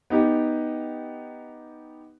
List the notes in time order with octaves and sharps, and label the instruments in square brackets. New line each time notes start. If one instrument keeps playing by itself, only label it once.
[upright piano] B3 D#4 G4